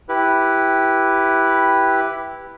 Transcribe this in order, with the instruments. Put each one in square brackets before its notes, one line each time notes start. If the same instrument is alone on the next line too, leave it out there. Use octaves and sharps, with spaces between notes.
[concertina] E4 G4 B4